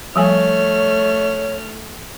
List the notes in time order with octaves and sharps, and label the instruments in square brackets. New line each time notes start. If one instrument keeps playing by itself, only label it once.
[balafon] F3 G3 G#5 [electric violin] A3 F6 [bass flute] C#5